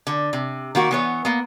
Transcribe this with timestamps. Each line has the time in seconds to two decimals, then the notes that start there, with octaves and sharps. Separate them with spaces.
0.07 D3
0.33 C3
0.75 D#3 A#3 F#4
0.91 E3 B3 C#5
1.25 A#3 B3